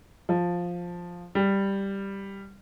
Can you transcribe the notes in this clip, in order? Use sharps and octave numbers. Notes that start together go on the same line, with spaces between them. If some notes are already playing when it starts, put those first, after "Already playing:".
F3
G3